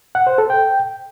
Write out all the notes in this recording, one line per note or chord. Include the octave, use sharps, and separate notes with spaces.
F#5
C5
A4
G5